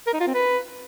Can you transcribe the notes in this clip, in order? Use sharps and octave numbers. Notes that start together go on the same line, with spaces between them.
A#4
D#4
F4
C4
B4